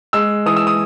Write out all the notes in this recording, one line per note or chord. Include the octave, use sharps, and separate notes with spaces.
G#3 E6
E3 D#6
E6
D#6